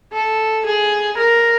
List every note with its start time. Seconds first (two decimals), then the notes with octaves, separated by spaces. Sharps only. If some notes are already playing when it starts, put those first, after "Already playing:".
0.13 A4
0.65 G#4
1.18 A#4